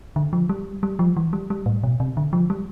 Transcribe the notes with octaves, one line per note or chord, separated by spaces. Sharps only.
D3
F3
G3
G3
F3
E3
G3
G3
A2
B2
C3
D3
F3
G3